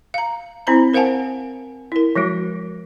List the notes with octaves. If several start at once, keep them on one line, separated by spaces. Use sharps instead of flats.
F5 A#5
C4 E4 C5 A#5 B5
A#4 C5 F5 F#5 G#5 A5
E4 A#4
F3 F#3 G#3 F#4